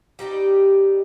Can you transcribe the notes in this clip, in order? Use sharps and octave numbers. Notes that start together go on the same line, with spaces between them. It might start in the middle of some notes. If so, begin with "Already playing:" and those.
G3 D#4 F#4 G4